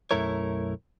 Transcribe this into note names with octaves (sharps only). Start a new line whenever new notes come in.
B1 F#2 A3 E4 A#4 C#5